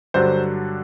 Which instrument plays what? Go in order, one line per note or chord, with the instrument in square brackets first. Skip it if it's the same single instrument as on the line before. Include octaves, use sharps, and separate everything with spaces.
[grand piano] G2 D3 F#3 C5